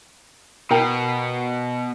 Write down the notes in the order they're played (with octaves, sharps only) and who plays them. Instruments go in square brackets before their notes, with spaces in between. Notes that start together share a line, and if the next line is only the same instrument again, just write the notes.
[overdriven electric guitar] B2 [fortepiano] A#4 G5 A#5